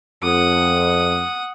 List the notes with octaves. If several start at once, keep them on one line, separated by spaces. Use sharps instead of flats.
F2 F#5 D#6